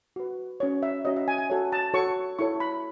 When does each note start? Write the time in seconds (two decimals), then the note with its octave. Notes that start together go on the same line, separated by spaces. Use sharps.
0.16 F#4 B4
0.60 C#4 F#4 C#5
0.83 E5
1.05 C#4 F#4 C#5 D#5
1.16 E5
1.28 G#5
1.38 G#5
1.50 F#4 A4 C#5
1.72 A5
1.94 F#4 A4 C#5 C#6
2.39 E4 A4 C#5 C#6
2.60 B5